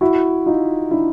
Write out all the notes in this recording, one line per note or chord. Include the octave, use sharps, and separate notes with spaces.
E4 F#4
D#4 F4
D4 E4